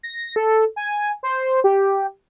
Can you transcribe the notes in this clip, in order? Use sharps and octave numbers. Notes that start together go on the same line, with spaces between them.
A#6
A4
G#5
C5
G4